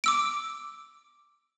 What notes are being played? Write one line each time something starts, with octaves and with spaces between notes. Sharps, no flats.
D6 E6 D7